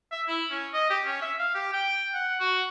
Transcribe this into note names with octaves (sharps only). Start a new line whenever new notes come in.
E5
E4
C#4
D#5
G4
C#4
E5
F5
G4
G5
F#5
F#4